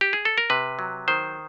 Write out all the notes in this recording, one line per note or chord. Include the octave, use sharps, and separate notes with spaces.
G4
G#4
A4
A#4
C3 B4
F#3
D#3 C5